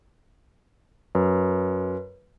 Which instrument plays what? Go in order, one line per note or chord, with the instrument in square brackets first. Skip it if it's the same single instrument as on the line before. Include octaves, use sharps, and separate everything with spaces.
[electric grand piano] F#2 [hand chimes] B4